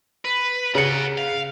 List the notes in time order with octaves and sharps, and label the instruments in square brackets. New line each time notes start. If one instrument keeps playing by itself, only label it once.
[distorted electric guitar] B4
[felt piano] C#3 C#7 [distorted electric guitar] A#4 F#5
[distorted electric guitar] F5